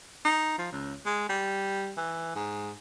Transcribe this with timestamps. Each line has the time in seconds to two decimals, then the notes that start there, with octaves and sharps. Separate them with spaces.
0.25 D#4
0.58 F3
0.72 C#2
1.06 G#3
1.29 G3
1.97 E3
2.35 G#2